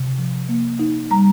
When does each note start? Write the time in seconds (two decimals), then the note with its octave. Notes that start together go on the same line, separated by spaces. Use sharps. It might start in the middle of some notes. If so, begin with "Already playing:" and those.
Already playing: C3
0.18 F3
0.49 A#3
0.79 D#4
1.11 G3 A#5